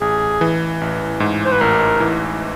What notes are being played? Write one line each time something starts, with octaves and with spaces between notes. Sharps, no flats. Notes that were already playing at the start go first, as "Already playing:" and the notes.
A1 G#4
E3
A1
G#2
C5
B4
A1 A#4
E3